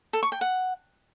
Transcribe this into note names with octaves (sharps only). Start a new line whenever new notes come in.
A4
C#6
G5
F#5